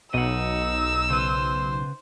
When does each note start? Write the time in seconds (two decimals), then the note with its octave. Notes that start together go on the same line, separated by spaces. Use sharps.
0.14 B1 D#4 D#5 F#5 E6
1.10 C#3 B4 C5 C6